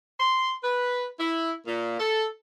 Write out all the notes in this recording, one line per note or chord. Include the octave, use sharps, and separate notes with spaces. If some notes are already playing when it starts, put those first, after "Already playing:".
C6
B4
E4
A#2
A4